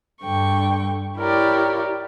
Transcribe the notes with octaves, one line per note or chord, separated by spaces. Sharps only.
G2 D3 G5 C#6
E4 G4 A#4 C#5 D5